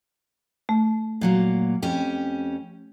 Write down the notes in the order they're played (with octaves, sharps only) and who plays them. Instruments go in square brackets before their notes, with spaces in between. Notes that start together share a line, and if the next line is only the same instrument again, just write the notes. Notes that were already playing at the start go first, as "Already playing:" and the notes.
[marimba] A3
[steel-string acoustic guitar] A#2 F#3 A#3
F2 C#4 G4